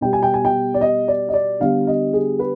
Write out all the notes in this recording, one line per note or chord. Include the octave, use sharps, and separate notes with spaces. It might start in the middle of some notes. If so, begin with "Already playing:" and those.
B2 G3 B3 G5
G#5
G5
G#5
G5
D5
D#5
D5
D#5
D5
D3 G3 B3 F5
D#5
G#4
B4